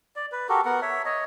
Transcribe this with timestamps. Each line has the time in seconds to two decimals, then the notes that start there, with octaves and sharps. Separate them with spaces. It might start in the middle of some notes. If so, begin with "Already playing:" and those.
0.16 D5
0.32 B4
0.49 F#4 G4 A4 A#4
0.65 B3 A#4 F#5
0.82 C#5 E5
1.05 C#5 D#5